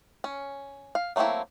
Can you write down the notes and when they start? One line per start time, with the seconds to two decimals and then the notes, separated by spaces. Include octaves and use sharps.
0.24 C#4
0.95 F5
1.16 F#3 A3 A#3 C4 E4